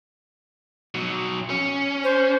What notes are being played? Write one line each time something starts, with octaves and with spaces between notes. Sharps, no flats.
B2 F#3
C#4
C5